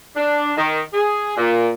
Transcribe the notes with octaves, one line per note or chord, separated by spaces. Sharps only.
D4
D#3
G#4
A#2